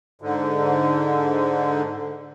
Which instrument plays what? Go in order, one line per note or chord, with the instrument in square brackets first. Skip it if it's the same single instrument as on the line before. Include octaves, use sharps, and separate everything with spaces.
[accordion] G#2 D3